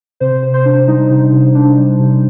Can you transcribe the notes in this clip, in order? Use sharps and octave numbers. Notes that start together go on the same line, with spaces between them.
C3 C5
C3
C5
D4
G3 D#4
C3
C3
D4
G3
C3